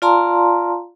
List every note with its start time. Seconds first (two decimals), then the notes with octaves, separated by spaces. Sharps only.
0.02 F4 D5 F5 A5 A#5 C6